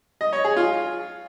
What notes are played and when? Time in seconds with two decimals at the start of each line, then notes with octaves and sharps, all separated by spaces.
0.21 D#5
0.33 C#5
0.45 G#4
0.56 F4